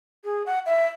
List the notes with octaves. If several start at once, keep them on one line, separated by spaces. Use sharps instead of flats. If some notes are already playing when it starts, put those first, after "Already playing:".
G#4
F#5
E5